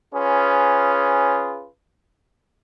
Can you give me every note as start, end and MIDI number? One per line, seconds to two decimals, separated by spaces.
0.15 1.67 61
0.15 1.67 65
0.15 1.67 68
0.15 1.67 71